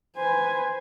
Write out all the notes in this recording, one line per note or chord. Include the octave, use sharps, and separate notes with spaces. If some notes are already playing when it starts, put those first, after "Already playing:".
B4 C5 G#5